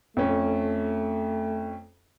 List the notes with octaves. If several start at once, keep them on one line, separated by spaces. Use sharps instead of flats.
F2 A3 C#4